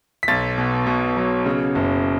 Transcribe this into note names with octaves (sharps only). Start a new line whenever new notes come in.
B6
B1 A6
B2
B2
F#3
C#3
F#1